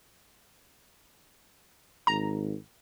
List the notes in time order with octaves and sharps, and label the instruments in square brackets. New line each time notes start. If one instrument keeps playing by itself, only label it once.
[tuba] G#1 [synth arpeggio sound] A#5